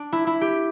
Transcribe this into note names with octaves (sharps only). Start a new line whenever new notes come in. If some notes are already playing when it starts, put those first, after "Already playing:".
Already playing: D4
E4
E4
G4